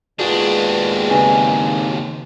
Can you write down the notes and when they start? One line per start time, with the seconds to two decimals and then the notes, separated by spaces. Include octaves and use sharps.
0.19 D#2 B2 G#3 D4 F4 F#4 G#4 B4
1.10 C#3 C4 D#4 F#4 G#5 A#5